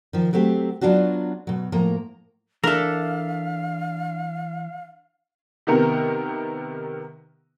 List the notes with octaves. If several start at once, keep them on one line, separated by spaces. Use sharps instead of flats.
D#3 F3
F#3 A3 C4 G4
F#3 B3 D4 F4 F#4
B2 F#3
A2 F3 A#3 A#5
E3 D4 A4 A#4 E5 F5
C3 D#3 B3 A#4